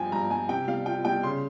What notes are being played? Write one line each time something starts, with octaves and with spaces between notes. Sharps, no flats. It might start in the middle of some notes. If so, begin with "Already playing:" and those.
Already playing: G2 F3 G5 G#5
G2 A#5
G2 G#5
C3 G5
G3 F5
F4 G5
G3 G5
C#3 C6